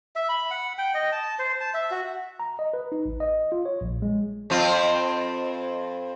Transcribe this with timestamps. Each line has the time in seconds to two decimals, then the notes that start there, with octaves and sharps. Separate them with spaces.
0.16 E5
0.29 B5
0.51 F#5
0.78 G5
0.94 D#5
1.12 A5
1.39 C5
1.61 A5
1.74 E5
1.91 F#4
2.40 A#5
2.59 D#5
2.74 B4
2.92 D#4
3.05 A1
3.20 D#5
3.52 F4
3.65 C#5
3.81 A#1
4.02 G#3
4.50 F2 C4 F4